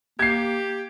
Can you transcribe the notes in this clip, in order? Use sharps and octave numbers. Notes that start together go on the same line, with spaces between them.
A#3 G4 G#6 C7